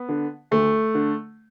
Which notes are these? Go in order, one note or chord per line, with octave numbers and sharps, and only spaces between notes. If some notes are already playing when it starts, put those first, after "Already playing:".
Already playing: B3
D3
D2 A3
D3